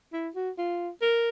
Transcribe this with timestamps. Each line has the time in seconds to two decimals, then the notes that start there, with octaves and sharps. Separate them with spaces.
0.13 E4
0.35 F#4
0.58 F4
1.02 A#4